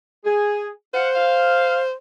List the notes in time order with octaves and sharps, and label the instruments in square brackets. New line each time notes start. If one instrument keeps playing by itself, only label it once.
[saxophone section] G#4
[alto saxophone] C5 [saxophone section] F5 F#5
[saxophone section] F5